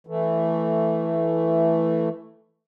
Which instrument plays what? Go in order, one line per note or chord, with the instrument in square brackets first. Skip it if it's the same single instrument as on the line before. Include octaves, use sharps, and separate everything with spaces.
[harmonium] E3 A3